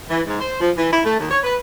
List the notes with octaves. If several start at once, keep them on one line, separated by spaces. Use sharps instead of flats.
E3
G#2
C5
F3
E3
E4
A3
D#2
C#5
B4